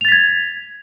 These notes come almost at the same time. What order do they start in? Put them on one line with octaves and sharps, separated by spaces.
F7 A6 B6 G#6